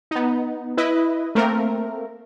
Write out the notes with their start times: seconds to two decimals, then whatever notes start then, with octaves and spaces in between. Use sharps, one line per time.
0.11 B3 D#4
0.77 E4 B4 D#5
1.35 A3 A#3 C4 A#4